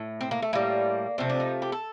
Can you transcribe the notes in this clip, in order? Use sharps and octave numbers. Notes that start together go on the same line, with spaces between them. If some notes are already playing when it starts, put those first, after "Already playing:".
Already playing: A2
C4
A#3
A3
A2 G3 A#3
C3 F3 A3 C4
D4
D#4
G4
A4